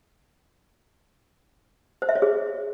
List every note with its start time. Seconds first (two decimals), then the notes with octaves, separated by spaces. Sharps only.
2.02 C5
2.09 E5
2.15 C#5
2.22 G#4